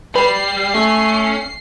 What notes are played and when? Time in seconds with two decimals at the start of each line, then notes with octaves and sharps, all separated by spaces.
0.15 G3 B4 C7
0.74 A3 C#4